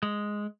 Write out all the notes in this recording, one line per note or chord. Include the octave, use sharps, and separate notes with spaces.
G#3